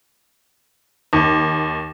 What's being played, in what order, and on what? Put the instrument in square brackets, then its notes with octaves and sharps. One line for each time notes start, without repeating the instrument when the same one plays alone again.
[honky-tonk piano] D#2